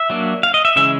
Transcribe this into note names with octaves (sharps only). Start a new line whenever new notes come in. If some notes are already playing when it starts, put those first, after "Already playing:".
Already playing: E5
F#3 A#3 D4
F5
D#5
E5
C#3 E3 G#3 C#4 E5